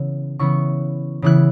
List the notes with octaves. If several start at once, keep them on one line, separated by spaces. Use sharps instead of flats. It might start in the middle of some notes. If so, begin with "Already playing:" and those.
Already playing: C#3 E3 B3 E4
C#3 E3 B3 E4 C#6
C#3 E3 B3 E4 F#6